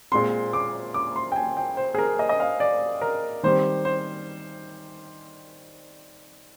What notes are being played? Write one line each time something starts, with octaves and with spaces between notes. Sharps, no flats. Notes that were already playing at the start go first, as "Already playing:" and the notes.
A#2 G#3 C4 C6
D6
D6
C6
G5
G#5
G5
C5
G#4
A#4
D#5
D#5
F5
D5
A#4
D#3 G3 C4 C5
C5